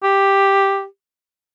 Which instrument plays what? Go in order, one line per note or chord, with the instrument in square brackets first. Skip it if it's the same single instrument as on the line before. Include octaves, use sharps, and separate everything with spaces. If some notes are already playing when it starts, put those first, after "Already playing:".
[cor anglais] G4